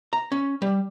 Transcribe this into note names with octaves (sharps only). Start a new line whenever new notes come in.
A#5
C#4
G3